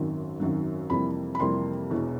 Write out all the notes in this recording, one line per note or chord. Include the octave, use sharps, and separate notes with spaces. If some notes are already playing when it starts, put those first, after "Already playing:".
Already playing: G#1 F#2 D#3 F#3
G#1 F#2 D#3 F#3
F2 C3 E3 G3 A#3 B5
B5
F2 C3 E3 G3 A#3 C6
E1 E2 B2